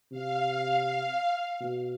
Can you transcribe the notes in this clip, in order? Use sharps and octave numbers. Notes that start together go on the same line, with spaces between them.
C3 F5
B2